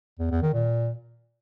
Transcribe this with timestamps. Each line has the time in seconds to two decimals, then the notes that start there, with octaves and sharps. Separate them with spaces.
0.19 E2
0.31 E2
0.42 D#3
0.54 A#2